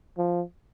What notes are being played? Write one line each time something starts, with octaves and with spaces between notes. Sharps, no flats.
F3